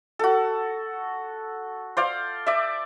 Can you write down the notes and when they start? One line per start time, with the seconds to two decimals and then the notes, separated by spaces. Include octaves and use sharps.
0.19 F#4 A4
1.97 C5 D5 F5
2.47 D5 E5